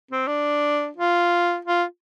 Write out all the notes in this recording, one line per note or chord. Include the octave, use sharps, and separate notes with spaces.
C4
D4
F4
F4